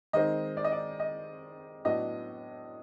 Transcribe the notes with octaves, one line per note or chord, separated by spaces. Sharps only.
D#3 G#3 C4 D#5
D5
D#5
D5
D#5
A2 F#3 B3 D4 D#5